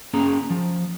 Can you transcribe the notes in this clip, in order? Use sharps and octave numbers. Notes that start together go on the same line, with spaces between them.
A#3 C#4 G#4 A#5
F3